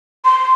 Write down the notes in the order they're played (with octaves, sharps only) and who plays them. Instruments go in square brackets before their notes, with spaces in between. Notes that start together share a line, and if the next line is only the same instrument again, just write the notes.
[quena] C6